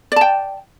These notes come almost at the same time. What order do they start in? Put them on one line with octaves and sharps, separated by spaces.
D5 A5 G5